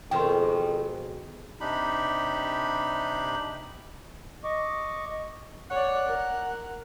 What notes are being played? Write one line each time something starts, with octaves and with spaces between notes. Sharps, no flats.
F2 B2 D#3 G#3 G5 C6
C3 D4 D#4 G4 B5
D#5 C#6 D6
C#5 D5 F#5
A#4